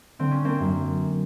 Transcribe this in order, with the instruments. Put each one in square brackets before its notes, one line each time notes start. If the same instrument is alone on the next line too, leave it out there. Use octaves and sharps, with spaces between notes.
[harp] D3 C4
C#4
A#3 C4
F#2